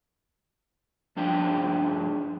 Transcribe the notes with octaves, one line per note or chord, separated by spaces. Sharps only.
G2 F3 D4 G#4 G5